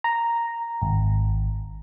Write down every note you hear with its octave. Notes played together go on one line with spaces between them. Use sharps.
A#5
G#1